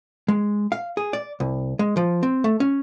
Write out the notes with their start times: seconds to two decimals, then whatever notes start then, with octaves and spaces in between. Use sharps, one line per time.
0.28 G#3
0.72 F5
0.97 G#4
1.13 D5
1.40 C2
1.79 G#3
1.97 F3
2.23 C4
2.44 A3
2.60 C#4